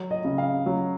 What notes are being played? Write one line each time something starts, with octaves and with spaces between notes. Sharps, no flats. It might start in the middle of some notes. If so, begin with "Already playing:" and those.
Already playing: F#3
D#5
C#3
F5
F#3